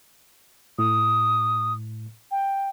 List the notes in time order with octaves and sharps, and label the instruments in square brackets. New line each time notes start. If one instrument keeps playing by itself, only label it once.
[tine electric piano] A2 [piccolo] D#6
[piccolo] G5